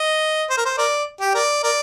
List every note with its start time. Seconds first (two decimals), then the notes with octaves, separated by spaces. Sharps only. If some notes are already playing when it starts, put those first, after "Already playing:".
Already playing: D#5
0.50 C5
0.57 A#4
0.66 C5
0.78 A#4 D5
1.20 G4
1.35 A#4 D5
1.63 A#4 D5